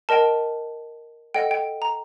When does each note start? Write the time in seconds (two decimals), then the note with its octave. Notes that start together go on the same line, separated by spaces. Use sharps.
0.09 A#4 D#5 G5 A5
1.34 A4 D#5 F#5 G5
1.51 G5
1.82 A#5